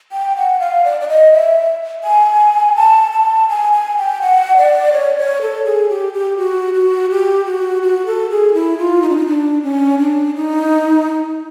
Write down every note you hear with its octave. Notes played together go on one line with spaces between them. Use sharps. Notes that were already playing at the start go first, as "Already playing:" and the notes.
G5
F#5
F5
D5
D5
D#5
E5
G#5
A5
A5
G#5
G#5
G5
F#5
D5
C#5
C#5
A4
G#4
G4
G4
F#4
F#4
G4
F#4
F#4
A4
G#4
E4
F4
D#4
D4
D#4
D4
C#4
D4
D#4